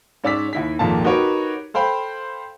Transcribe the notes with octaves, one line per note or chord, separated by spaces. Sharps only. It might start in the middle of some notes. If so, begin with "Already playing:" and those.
G#2 C#4 D5 E6 B6
D#2 E4 B6
G#1 F2 A#2 A#3 A5
D#4 F#4 G4 A#4 B4 C#5
A4 C5 F5 G5 B5